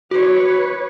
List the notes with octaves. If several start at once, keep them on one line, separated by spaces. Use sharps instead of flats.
F#4 B4 C#5